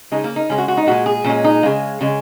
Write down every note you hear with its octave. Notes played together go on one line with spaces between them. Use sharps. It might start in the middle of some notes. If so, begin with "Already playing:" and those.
C#3 G#3 D#4
A#3
D#4
C#3 G#3 C#4
F#4
F#4
D#4
A#2 G#3 F#4
G#4
A#2 G#3 C#4
D#4
C#3 G#3
C#3 G#3